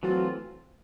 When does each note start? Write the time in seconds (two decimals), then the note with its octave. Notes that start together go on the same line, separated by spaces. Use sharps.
0.03 E3 F#3 A3 C4 F4